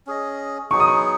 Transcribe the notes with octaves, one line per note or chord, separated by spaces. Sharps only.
C#4 G#4 D#5
F#3 B3 D#4 G#4 C#6
D#6
C#6